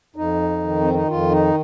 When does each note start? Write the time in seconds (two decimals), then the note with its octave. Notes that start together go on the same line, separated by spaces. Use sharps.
0.16 F2 D#4
0.63 D#3
0.81 C4
0.94 D#4
1.08 F2 F4
1.31 D#4